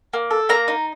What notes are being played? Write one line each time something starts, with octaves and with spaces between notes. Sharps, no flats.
A#3
A4
A#3 A#5
D#4